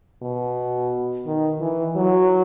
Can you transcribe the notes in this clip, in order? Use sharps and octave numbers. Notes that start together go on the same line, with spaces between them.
B2
D#3
E3
F#3